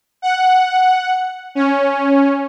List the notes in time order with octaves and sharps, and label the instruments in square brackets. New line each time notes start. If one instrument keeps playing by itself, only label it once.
[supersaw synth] F#5
C#4